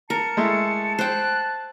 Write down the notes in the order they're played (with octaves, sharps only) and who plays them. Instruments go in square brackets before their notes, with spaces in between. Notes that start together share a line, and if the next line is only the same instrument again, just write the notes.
[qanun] A#4 [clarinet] A5 [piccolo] C#7
[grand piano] G#3 A3 E4
[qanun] C5 G5 [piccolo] F#6